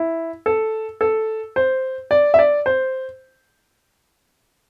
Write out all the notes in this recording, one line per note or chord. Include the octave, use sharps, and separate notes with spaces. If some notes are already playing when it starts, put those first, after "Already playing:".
Already playing: E4
A4
A4
C5
D5
E5
D5
C5